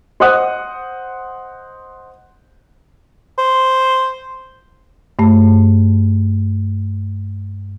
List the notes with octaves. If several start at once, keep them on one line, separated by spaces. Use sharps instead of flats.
C5 D#5 F#5 D#6 F#6
C5
G2 A3